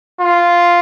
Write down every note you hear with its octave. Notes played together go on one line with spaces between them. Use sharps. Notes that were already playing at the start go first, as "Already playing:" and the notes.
F4